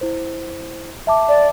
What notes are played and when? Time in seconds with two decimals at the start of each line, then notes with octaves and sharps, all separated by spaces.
0.01 E4 C5
1.07 E5 A5 D6
1.28 D5